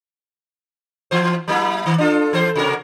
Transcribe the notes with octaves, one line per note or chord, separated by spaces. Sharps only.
E3 C5
F#3 A#3 E4
D#3
D4 F4 A4
E3 A4 C5
C3 F#4 A#4